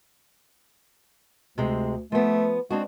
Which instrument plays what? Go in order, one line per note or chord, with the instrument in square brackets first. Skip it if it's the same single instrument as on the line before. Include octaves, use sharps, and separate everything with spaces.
[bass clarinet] D2 [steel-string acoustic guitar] C3 G#3 C4
[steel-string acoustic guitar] F3 B3 [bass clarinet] A3
[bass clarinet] G#3 [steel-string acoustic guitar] C4 D4 F#4